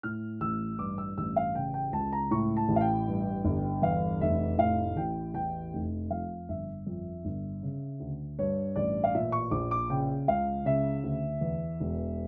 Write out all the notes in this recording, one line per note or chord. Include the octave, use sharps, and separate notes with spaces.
A2 F6
A1 E6
G2 D6
E6
A1 E6
F5
C#3 G5
G5
C#2 A5
A#5
A2 C#6
A5
A1
F5
G5
G2
G1
E2 F5
F1 E5
A2 F5
A1 G5
E2 G5
F1
F2 F5
G1 E5
F2
G1
C#3
D2
G2 C#5
A1 D5
F5
A#2 E5
C#6
A#1 D6
D6
C#3 G5
C#2 F5
C#3 E5
D2
E2
E1